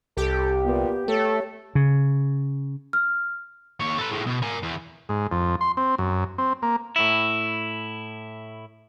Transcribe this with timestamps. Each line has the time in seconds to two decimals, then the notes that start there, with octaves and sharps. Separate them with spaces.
0.17 C2 G4 A4
0.64 A#2 B3
1.08 A3 A4 C#5
1.75 C#3
2.93 F6
3.80 D#2 C#5
3.98 A4 B4
4.11 A2 G#3
4.27 B2
4.42 A#4 G#5
4.63 E2 E3
5.09 G#2
5.32 F2
5.61 C6
5.77 C4
5.98 F#2
6.38 C4
6.62 A#3
6.96 A2 E4